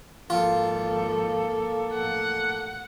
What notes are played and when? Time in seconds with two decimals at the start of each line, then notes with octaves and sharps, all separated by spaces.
0.30 G#1 F3 A#3 F4 A4
1.93 A1 F3 F#5